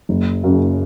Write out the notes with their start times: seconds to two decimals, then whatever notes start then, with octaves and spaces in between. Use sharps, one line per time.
0.09 F#1
0.44 F#2 C#3